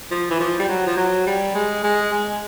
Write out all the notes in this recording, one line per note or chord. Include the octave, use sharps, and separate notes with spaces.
F3
E3
F3
G3
F#3
F3
F#3
G3
G#3
G#3
G#3